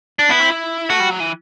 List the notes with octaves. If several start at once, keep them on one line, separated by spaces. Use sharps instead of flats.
D4
B3 E4
C4
E4
A3 F#4
G3
F#3
E3